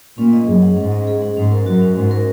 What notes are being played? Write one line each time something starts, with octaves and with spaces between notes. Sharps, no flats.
A#2 C#4
D#5
F#2 G#4
F#5
G#2 C#4
D#5
G#4
F#5
G#2 C#4
A#4
F#2 F#4
C#4
G#2 C#4
A#4